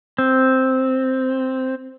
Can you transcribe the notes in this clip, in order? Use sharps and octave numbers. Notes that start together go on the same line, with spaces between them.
C4